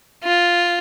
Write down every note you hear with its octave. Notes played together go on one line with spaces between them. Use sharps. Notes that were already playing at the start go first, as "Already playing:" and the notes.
F4